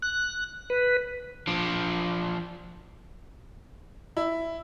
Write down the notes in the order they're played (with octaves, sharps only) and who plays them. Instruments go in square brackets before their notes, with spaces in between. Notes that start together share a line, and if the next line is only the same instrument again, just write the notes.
[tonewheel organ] F#6
B4
[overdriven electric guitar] F3 D4
[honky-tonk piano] E4